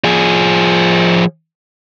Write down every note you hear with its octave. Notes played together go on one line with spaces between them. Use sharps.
F3 G#4